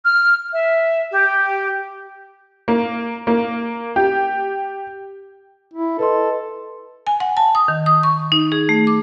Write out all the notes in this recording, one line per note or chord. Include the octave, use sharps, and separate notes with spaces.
F6
E5
G4
A#3
A#3
G4
E4
A4 B4 D#5 C6
G#5
F#5
A5
D#6
D#3
D#6
C#6
D#4
G#4
A3
D6